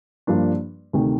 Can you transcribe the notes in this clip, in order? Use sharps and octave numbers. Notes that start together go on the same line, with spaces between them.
G2 F3 A#3 D4
D2 C3 D#3